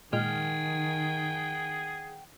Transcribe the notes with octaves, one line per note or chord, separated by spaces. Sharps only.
A#2 D#3 G#3 G#4 F#5 G5 F6